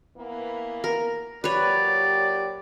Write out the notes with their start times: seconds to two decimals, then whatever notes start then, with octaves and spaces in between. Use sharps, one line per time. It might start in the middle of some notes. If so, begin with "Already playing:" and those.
0.17 E3 A#3 B3
0.84 A#4
1.44 A#2 F#3 G4 B4 C#5 D5